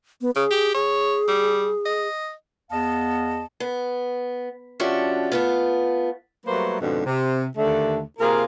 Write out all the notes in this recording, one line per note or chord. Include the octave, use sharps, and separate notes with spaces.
B3
C#3 G#4
G4
G#4 C#5
G3
D#5
E2 B3 D#5 F5 A5
B3
F3 C#4 D4 F#4 G4 E5
A3 B3 F4
F#3 G3 A3 A#3 B4 C5
F2 G#2 B2 D3
C3
D#2 D3 A3
C3 A#3 F4 G#4 A#4